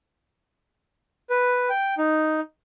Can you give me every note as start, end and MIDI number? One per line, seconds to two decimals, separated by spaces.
1.30 1.69 71
1.69 1.95 79
1.98 2.40 63